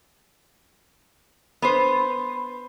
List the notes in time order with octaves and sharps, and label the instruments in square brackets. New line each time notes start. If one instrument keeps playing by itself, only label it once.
[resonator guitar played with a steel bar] B3 B4 C5